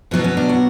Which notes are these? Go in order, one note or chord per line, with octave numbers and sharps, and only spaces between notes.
B2 F#3 B3 D4
C#4
D4
F#4